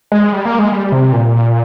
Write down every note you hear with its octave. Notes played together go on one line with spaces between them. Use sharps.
G#3
G3
A#3
G#3
G3
C3
A#2